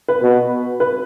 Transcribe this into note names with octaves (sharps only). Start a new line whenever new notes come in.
B4
B2
B4